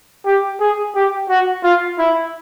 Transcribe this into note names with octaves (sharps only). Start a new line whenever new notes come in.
G4
G#4
G4
F#4
F4
E4